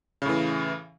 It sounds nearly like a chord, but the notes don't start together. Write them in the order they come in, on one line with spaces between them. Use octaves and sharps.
C#3 A2 E3